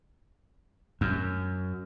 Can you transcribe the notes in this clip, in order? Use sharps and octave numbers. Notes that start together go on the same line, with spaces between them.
F#2